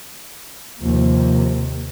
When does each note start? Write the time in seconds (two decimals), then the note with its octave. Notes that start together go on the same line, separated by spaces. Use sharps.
0.83 D#2 C3 F3 A#3